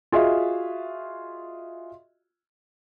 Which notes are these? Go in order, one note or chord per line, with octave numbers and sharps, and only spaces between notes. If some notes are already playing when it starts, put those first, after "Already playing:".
F4 F#4 G#4 D#5 E5